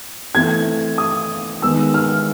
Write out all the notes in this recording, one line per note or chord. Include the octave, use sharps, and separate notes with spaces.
E3 A3 C4 G#6
D#6
D#3 G#3 B3 E6
F6